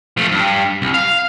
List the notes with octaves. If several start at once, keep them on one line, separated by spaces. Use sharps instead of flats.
F3 A3
G2
C2
F5